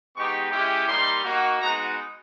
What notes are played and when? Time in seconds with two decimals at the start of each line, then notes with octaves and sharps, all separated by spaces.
0.15 G#3 B3 D#4 G4 C#6
0.51 G#3 C#4 E4 G4
0.87 G3 A#3 D#4 C6
1.24 A#3 D#4 F#4
1.60 G#3 B3 D#4 F#4 A#5